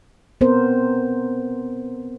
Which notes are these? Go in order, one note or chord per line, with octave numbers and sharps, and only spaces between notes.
B3 C4 A#4 C5